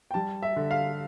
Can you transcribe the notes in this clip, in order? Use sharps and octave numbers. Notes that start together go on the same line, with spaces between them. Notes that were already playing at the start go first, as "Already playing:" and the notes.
G5
G3 A5
E5
D3
F5